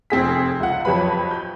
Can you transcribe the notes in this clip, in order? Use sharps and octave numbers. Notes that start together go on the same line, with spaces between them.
F1 C4 G#4 B6
C#2 F#5
F2 F#3 G4 B4 B5
G6